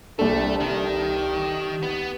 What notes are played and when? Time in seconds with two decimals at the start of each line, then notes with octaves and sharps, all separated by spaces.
0.19 C2 A3 D4 A4
0.60 D#3 G4
1.83 B3